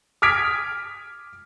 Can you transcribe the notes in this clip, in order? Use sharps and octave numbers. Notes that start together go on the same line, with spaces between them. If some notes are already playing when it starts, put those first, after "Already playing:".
D6 D#6 F6 G#6 B6 D7